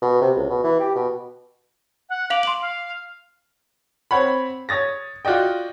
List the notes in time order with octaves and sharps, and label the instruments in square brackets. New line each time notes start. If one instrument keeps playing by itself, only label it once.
[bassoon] B2
C3
C#2
B2
E3
G4
B2
[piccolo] F#5
[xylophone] F5 F7 F#7 [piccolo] D6
[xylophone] C6 F#7
[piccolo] F5
[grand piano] C4 C#5 F#5 B5
C#5 D#6 A6 A#6
F4 F#4 D5 D#5 G5